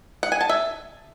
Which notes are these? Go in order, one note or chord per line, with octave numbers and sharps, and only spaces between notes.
F#5
G#5
A5
E5